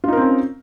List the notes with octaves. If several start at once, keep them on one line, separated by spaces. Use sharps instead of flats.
C4 C#4 D#4 F4 A#4